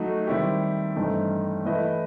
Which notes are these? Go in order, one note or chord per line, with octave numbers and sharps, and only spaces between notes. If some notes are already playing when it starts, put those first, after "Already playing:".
Already playing: F#3 A3 D#4 F#4
D#3 G3 C4 E4 G4
G2 E3 A3 C4 D#4
E3 A3 E4 B4 D#5